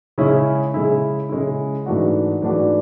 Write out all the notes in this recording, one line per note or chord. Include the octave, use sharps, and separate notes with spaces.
C#3 G#3 C#4 E4
C#3 G#3 C#4 E4
C#3 G#3 C#4 E4
G#2 E3 A3 D4 F#4
G#2 E3 A3 D4 F#4